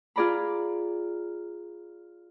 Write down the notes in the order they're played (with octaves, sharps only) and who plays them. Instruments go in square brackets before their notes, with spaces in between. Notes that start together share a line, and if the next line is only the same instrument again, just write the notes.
[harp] F4 G#4 D5 A#5 B5